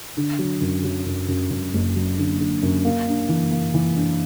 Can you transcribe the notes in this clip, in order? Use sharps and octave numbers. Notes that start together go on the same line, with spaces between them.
D3
F#3
F#2
F#3
F#2
F#2
F#2
F#1
F#3
D3
D3
F#2
A#3
D4
E3
A#3
E3
D4